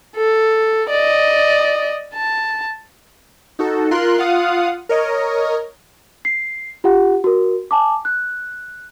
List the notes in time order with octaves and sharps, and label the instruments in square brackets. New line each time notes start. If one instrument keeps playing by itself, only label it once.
[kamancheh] A4
D5 D#5
A5
[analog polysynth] D#4 F#4 A4
F4 A#4 C6 F#6
F4 F5 F#5 D#6
A#4 C#5 D#5
[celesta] C7
F4 G4 F#5
F#4 A#4
G#5 A5 D6
F#6